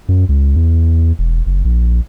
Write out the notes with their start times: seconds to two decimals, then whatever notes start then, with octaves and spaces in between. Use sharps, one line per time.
0.09 F#2
0.29 C#2
0.56 E2
1.19 E1
1.46 F#1
1.65 A#1